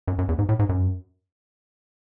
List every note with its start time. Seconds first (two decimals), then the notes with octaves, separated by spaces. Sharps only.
0.08 F#2
0.18 F#2
0.29 E2
0.39 G#2
0.49 A2
0.59 G#2
0.69 F#2